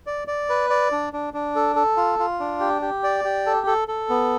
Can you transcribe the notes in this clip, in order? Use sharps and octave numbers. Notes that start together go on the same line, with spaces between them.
D5
D5
B4
D5
D4
D4
D4
A4
A4
F4
F4
D4
G4
G4
D5
G4
A4
A4
A4
B3